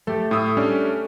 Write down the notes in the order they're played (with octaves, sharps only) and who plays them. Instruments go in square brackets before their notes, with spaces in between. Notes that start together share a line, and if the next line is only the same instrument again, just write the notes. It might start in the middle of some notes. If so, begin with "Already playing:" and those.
[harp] A3 [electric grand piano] G4 A4
[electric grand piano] A2 D#6 E6
G3 C#4 D4